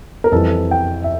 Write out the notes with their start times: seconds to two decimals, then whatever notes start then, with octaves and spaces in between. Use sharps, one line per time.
0.24 A#4
0.32 F2 E3 G3 A4
0.71 G5
1.04 E5